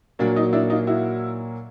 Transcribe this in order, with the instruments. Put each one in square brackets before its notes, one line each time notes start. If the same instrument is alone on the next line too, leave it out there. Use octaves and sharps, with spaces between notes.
[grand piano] A#2 F#3 A#3 D4
D#4
D4 E4
D#4 F4
E4 F#4